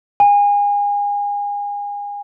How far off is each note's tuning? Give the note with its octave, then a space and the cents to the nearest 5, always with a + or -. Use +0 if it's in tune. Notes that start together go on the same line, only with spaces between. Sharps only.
G#5 -30